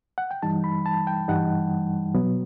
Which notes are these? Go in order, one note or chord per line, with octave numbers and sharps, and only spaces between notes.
F#5
G5
G2 E3 G3 D#4 A5
B5
A5
G5
G2 E3 G3 D#4 F#5
B2 F#3 B3